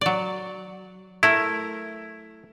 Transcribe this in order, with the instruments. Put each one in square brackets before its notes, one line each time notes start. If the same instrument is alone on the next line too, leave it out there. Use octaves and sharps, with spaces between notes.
[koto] F#3 D5
[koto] A3 A#4 [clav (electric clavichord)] E4